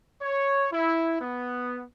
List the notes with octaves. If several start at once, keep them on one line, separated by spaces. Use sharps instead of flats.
C#5
E4
B3